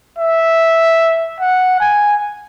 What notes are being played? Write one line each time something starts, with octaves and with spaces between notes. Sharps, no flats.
E5
F#5
G#5